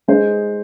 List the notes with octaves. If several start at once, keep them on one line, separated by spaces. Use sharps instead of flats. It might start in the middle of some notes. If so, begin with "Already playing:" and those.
G#3 D#4 G#4 C5